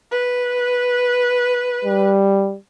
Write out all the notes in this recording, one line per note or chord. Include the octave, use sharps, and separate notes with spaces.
B4
G3